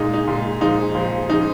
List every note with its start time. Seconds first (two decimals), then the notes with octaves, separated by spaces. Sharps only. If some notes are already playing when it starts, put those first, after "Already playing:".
Already playing: A#2 G#3 D#4
0.14 D#4
0.27 A#2 G#3
0.61 A#2 F3 G#3 D#4
0.95 A#2 F3 G#3
1.29 C#3 F3 G#3 D#4